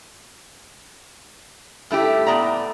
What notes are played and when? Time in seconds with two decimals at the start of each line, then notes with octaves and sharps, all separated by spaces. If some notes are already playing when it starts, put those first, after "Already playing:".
1.91 G2 A3 E4 G4
2.27 A2 B3 D5 A#5